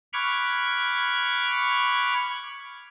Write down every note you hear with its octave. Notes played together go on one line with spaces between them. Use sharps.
B5 C#6 D6 F6 F#6 G#6